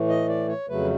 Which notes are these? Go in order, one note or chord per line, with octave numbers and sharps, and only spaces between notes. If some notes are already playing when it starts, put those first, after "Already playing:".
Already playing: A2 E3 A3
D#5
D5
C#5
F2 C#3 F#3 A3 B4